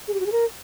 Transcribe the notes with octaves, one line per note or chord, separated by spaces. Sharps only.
G#4
G4
F#4
G#4
A#4